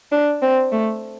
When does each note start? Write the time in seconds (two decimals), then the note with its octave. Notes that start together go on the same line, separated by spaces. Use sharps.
0.12 D4
0.42 C4
0.72 A3